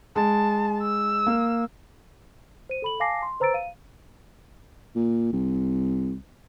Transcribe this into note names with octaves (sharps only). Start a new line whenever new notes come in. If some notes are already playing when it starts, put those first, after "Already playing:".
G#3 A5
E6
A#3
C5 D#7
A4 B5 F#7
F5 G#5 A5 D6 A#6 C7
C6
B4 C5 A#5 E6 A6 D7
F5 D#7
A#2
C2